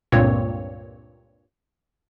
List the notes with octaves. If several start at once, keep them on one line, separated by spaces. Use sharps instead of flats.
C#2 G2 A#2 A#3 C4 C#5